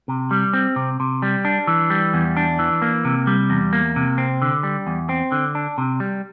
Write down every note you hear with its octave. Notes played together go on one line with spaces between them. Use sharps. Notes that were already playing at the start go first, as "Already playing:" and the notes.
C3
G3
C4
C3
C3
G3
D4
E3
G3
E2
D4
E3
A#3
C3
G3
E2
A#3
C3
C4
D3
G3
E2
C4
D3
D4
C3
G3